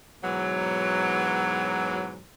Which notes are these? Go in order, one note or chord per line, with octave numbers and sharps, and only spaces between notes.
G#2 B2 E3 F#3